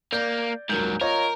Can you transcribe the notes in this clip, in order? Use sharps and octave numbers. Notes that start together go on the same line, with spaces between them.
A#3 D5 G6
D#1 G#2 F#3 A#4 G6
F4 A#4 C#5 D#5